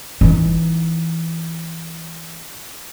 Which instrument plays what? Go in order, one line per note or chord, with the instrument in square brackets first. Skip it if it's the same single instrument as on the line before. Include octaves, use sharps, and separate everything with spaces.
[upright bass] E3 D#4